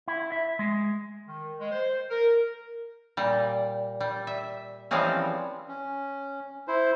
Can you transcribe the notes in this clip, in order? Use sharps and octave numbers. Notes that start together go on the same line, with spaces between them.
E4
E5
G#3
D#3
G#3
C5
A#4
A#2 G3
G3
E5
E3 F3 G3 G#3 C4 C#4
C#4
E4 C5